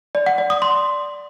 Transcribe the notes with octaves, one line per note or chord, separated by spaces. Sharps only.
D5
F#5
D5
D#6
C6